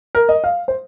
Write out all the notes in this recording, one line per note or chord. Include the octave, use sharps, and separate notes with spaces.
A#4
D#5
F5
C5